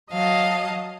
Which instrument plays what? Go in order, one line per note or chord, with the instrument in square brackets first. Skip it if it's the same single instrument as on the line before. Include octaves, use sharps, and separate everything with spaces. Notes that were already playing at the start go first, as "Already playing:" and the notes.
[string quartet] F#3 D#5 F5 A5